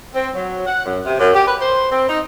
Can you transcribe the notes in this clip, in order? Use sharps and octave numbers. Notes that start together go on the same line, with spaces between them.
C4
F#3
F#5
F#2
C3
F#2
G4
B4
C5
C4
D#4